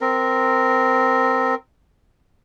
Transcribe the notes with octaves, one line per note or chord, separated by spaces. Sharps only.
C4 A#4